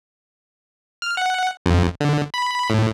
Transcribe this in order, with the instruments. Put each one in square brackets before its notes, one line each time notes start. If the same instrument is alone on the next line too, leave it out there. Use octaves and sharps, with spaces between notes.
[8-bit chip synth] F6
F#5
F2
D3
B5
A2